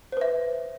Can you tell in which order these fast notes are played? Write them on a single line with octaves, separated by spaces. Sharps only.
C5 B4 E5